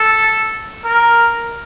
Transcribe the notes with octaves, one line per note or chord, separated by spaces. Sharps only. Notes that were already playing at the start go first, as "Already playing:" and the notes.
Already playing: A4
A#4